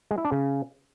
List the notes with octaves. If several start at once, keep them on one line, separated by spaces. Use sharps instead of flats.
G#3
E4
D4
C#3